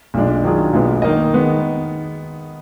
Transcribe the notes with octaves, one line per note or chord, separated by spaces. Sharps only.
B1 A#2 G#3 D4
D#3 F#3 D4 F4 G#4
B1 A#2 G#3 B3
D#3 A#3 D#4 A#4 D#5
D#3 G#3 B3